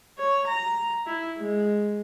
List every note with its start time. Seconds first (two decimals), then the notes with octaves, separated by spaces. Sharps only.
0.18 C#5
0.47 A#5
1.06 E4
1.39 G#3